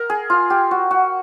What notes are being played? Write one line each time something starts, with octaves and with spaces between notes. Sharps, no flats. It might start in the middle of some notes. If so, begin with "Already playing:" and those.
Already playing: A#4
G#4
F4
G4
F#4
F#4